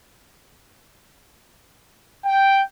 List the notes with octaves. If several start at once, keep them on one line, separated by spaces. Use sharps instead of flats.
G5